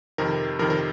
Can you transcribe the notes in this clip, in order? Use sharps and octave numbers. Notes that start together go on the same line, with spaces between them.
F2 C3 D#3 A#4
F2 C3 D#3 A#4
A#4